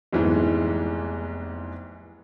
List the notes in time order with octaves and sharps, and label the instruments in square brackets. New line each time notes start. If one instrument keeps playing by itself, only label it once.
[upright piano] F1 B1 G#2 E3